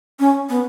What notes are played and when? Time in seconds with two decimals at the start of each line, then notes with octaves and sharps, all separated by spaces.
0.19 C#4
0.49 B3